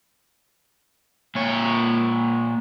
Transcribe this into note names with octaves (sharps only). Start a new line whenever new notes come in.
A#2 C#5